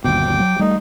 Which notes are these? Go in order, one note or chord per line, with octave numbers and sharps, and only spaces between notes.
G1 D#2 B2 G5 D6
F#3
G3 A3 D#4